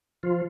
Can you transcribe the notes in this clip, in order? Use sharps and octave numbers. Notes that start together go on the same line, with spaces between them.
F3 F4